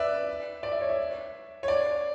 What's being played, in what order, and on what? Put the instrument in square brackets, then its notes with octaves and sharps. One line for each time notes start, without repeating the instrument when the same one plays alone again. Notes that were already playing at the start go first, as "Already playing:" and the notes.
Already playing: [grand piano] B4 D5 E5
D5
E5
C#5
E5
C#5
D5